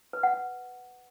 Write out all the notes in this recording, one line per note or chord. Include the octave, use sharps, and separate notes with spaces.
B4
F#5
F#5